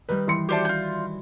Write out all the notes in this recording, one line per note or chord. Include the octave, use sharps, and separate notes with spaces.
D#3 G3 B4
E3 C6 C#7
F#4 G4 C5 D5 E5 A5
F4 G6